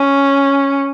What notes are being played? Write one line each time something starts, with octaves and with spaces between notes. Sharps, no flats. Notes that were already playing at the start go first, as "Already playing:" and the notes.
Already playing: C#4